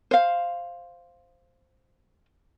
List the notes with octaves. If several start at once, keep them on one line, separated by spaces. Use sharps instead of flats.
C5 F5